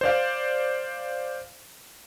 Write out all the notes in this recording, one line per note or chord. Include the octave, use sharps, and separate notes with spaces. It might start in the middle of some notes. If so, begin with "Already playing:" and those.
C5 D5 F5